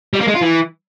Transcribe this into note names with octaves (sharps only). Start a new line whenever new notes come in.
G3
A#3
G#3
F4
E3